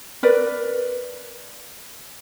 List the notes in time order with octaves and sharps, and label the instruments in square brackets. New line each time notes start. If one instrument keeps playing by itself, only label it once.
[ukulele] A#4 B4 D5